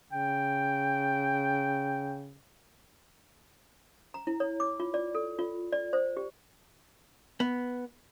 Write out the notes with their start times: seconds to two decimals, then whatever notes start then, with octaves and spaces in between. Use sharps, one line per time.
0.13 C#3 G5
4.14 A#5
4.27 E4
4.40 C#5
4.60 D6
4.80 F4
4.94 D5
5.15 A4
5.39 F4
5.72 D5
5.93 C5
6.17 G4
7.40 B3